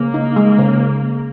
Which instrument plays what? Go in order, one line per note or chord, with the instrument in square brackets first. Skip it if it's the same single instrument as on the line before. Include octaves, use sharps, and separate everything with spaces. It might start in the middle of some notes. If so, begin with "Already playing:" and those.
Already playing: [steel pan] C#3 [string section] A#3
[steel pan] D#4
G#3
C#3